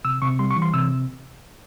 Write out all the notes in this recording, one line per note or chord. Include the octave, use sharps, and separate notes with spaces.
C3 E6
C3 C#6
G3 C6
C#6
E3
C6
C3 E6